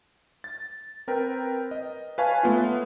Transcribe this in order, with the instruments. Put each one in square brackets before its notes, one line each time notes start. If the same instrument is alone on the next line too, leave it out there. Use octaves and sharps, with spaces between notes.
[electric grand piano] A6
C4 A#4 B4 G5
D#5
B4 C#5 F5 G#5 A5 C#6
A3 B3 F4